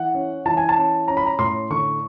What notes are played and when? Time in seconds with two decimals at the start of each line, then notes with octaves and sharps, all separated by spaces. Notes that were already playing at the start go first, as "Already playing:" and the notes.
Already playing: E3 F#5
0.14 C#4
0.46 E3 A5
0.57 G#5
0.69 A5
0.76 C#4
1.08 C#4 A#5
1.17 B5
1.26 A#5
1.39 A2 C6
1.70 D3 C#6